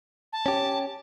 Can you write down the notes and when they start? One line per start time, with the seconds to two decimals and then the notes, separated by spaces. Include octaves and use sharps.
0.32 A5
0.46 C#4 G4